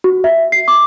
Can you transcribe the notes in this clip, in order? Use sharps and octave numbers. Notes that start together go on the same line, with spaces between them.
F#4
E5
C7
D6